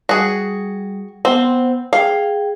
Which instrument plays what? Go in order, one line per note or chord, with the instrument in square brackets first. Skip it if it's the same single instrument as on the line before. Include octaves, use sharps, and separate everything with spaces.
[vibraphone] G3 [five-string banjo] F#4 G#4
[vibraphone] B3 F#5 [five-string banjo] C4
[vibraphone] G#4 G5 [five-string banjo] F5